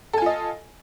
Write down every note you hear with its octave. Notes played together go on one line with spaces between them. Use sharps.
F4 A4 D#5 G#5